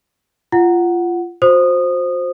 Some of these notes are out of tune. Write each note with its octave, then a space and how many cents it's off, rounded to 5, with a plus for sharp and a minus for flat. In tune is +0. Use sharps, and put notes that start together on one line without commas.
F4 -20 F#5 +0
F#4 -40 C5 +5 D#6 -20